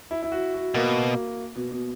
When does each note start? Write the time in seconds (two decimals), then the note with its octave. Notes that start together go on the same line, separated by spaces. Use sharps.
0.11 E4
0.23 E4
0.32 F#4
0.54 F#4
0.74 B2 A#3
1.56 B2
1.71 B2